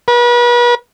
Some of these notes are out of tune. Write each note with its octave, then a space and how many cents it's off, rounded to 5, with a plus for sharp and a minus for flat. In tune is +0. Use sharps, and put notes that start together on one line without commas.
B4 -40